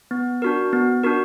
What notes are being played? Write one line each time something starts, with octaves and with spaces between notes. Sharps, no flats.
B3
D4 F#4 A#4
B3
D4 F#4 A#4